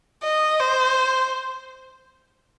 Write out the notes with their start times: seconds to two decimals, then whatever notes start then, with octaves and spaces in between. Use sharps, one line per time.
0.23 D#5
0.60 C5